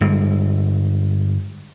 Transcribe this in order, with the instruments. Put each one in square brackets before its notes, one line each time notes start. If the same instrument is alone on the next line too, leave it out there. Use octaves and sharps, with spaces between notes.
[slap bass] G1 G2 G#3